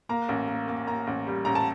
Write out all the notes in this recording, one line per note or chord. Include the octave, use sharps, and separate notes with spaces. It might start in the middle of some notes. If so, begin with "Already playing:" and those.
A#3 A#5
A1
A#3
A#3
A#3 A#5
A1
G3
A1 A#5
A5